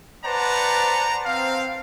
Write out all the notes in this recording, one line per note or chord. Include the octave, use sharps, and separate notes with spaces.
B4 C5 D5 F#5 A5 A#5
C4 F5